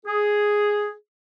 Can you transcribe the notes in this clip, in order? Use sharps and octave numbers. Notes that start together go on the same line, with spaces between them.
G#4